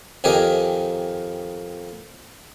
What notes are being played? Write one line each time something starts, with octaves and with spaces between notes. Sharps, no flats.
F2 D#3 G4 G#4 A#4